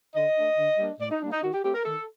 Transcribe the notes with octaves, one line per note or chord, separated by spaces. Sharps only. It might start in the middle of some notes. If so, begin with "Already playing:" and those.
D3 D#5
A3 D4
D3
G3 A#3 D4
A2 D5
D#4
G3 A#3 D4
D#4
D#3 F#4
G4
A3 C4 G4
A#4
D#3 A4